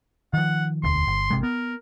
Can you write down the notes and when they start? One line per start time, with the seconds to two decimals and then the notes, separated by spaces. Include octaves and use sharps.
0.34 D#3 F3 F#5
0.84 E1 D2 C6
1.07 G1
1.30 G#1 C3 G#3
1.43 B3 A#4